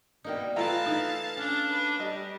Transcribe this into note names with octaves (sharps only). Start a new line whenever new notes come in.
B2 G3 A#3 D#4
E3 A3 E4 F4 F5 A5 A#5
D#4 E4 B4
C#4 D4
B4
G3 D#5